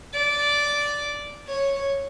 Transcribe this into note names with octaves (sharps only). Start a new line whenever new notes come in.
D5
C#5